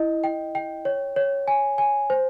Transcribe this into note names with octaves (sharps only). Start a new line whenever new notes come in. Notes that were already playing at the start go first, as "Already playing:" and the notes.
Already playing: E4 D#5
G5
G5
C#5
C#5
G#5
G#5
C5